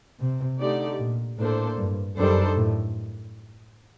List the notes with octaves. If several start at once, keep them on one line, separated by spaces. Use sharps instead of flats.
C3
D3 A3 D#4 G4 D5
A#2
A2 A#3 D4 A4 C5
G2
F#2 D#3 G3 D4 A4 C5
A2